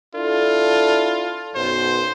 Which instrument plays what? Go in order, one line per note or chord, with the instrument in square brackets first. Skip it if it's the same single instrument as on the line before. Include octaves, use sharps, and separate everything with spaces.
[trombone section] D4 E4 A4 [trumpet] F4
[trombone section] B1 F#2 [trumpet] C5